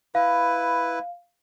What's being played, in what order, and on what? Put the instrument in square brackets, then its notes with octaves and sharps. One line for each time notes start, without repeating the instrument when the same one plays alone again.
[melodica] E4 B4 [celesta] F5